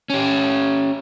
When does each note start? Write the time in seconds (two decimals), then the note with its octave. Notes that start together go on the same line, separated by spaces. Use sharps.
0.10 C#4 G4